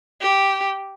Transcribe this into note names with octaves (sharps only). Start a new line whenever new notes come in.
G4